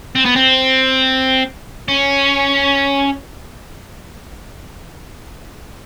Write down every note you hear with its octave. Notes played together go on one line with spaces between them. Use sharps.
C4
B3
C4
C#4